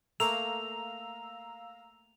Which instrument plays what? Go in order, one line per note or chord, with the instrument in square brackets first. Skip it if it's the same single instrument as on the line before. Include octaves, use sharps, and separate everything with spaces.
[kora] A3 A#3 [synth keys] F5 A#5 E6 [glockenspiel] F7